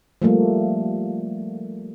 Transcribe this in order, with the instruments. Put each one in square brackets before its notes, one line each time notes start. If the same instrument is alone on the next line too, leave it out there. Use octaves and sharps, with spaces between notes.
[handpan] F3 G3 A3 A#3